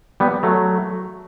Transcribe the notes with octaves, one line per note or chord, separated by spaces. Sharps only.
G3 B3
F#3 A3